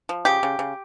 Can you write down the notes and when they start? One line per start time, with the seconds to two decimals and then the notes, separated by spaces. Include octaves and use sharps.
0.09 F3
0.25 C#3 G4
0.43 C#3
0.59 C#3